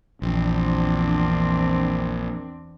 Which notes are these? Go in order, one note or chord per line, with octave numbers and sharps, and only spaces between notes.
A#1 E2 C4 D4